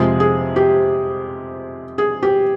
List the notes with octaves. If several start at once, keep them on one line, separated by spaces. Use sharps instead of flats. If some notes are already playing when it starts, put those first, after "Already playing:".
Already playing: F2 C3 F3 G#3 G#4
G#4
G4
G#4
G4